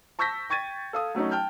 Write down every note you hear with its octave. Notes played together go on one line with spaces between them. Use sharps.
A5 C#6 E6 G6 A#6 B6
G5 C#6 G#6 A6 D#7
A4 F5 D#6
F#3 A3 C#4 D#4
G5 A5 F6 G6